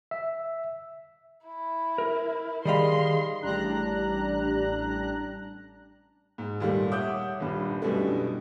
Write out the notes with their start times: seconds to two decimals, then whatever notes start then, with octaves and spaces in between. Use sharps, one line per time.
0.11 E5
1.46 E4
1.98 A#4
2.65 D#3 G3 G#4 D#5 F5 B5 C6
3.42 A1 G3 D4 A#5 F#6
6.38 G#2
6.60 D#2 A#2 G3 A3
6.91 C#5 E5 F#5 D6 D#6 G6
7.40 D#1 G2
7.81 F#2 B2 D3 G3 A3 E4